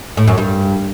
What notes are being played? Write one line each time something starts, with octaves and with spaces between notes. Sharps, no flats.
A2
F#2
G2